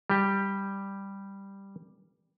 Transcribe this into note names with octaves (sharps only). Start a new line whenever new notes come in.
G3 G4